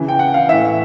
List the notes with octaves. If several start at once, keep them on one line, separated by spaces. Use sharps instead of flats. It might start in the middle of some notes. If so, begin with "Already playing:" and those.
Already playing: C#3 E3
G5
F#5
F5
A2 E3 E5